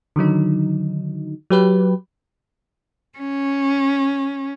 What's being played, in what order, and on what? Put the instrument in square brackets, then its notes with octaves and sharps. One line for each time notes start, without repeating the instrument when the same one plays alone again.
[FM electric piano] D3 D#3 F#3 D#4
F#3 G4 B4
[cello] C#4